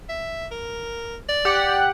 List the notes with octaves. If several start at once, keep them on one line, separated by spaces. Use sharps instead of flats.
E5
A#4
D5
G4 F#5